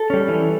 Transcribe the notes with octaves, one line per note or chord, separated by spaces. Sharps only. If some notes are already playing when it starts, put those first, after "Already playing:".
Already playing: A4
G3 C#4
E3